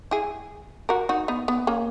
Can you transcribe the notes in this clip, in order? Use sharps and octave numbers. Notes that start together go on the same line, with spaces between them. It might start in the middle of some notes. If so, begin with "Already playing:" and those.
E4 G#4
F#4 A#4
D#4 F#4
B3 D#4
B3
A#3 C#4